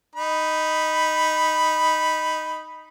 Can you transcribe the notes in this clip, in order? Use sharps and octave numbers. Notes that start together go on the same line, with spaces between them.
D#4 B5